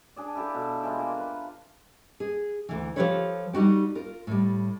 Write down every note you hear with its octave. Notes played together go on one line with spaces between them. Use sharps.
D4 G#4 D5
E4 G4 A4 F5
B2
E3 G#3 F4
A#3
B4
G#4
D2 E3
F3 F4 G4 A4 B4 C#5
G3 D#4 F#4 G4
F4 A#4
A2 G3